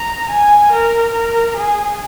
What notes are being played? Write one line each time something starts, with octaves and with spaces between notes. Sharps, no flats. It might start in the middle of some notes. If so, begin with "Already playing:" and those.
Already playing: A#5
G#5
A#4
A#4
G#4